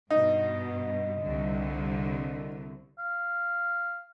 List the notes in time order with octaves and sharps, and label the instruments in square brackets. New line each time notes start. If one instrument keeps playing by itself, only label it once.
[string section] G2 B2 [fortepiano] D#4
[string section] C2 D3
[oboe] F5